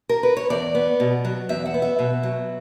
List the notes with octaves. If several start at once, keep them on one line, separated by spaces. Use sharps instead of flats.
A#4
B4
C#5
E2 D5
B3
B2
F#3
E2 E5
F#5
B3
E5
B2
F#3